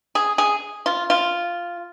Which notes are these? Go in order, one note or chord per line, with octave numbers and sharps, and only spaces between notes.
G#4
G#4
F4
F4